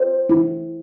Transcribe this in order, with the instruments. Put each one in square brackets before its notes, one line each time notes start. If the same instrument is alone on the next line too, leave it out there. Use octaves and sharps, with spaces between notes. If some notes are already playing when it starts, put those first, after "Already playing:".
Already playing: [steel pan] C5
E4